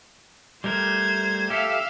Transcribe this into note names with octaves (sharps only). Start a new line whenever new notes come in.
G3 A3 A#4 C5 G#6
G4 A4 E5 F5